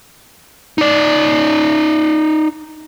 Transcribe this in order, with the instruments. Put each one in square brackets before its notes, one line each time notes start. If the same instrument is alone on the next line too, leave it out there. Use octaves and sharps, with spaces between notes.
[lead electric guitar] D#4 D5